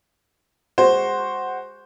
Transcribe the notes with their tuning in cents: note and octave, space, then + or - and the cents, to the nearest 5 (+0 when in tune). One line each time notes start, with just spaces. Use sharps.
G#3 -25 F#4 +0 C5 +0